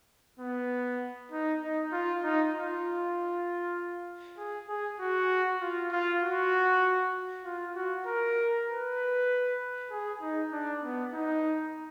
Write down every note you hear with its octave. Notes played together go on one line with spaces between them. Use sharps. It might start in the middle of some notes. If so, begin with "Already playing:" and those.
B3
D#4
D#4
F4
D#4
F4
G#4
G#4
F#4
F4
F4
F#4
F4
F#4
A#4
B4
G#4
D#4
D4
B3
D#4